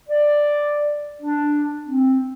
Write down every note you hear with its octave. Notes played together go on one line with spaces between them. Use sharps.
D5
D4
C4